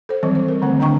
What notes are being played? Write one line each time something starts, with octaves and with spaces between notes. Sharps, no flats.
A4 C5
D#3 E3 F#3 G3 C4
C5
A#4
D3 D#3 A3 C4
D3 D4 D#5 G5 A#5 C#6